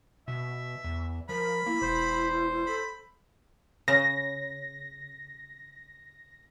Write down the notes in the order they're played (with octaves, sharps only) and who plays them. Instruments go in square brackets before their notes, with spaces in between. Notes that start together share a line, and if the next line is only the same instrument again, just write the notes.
[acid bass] B2 [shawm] E5
[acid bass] E2
[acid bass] F3 [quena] A#4 [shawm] B5
[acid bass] A#3 [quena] E4
[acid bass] E1 [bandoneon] C5
[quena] A4 [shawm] B5
[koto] C#3 [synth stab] A#6